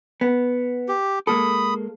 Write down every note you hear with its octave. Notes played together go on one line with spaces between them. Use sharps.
B3
G4
G#3 A#3 A4 B5 D#6